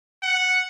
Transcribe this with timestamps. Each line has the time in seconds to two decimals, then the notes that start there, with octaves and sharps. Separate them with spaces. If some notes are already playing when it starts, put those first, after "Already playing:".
0.23 F#5